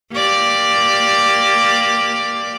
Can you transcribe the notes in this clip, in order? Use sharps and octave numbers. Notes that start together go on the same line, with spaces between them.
A#3 G4 D5